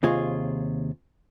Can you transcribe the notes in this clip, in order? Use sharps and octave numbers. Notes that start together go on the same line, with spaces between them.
D#2 C3 F4 G#4 C#5